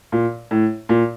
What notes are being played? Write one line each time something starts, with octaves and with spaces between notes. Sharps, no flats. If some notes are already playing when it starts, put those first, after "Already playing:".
A#2
A2
A#2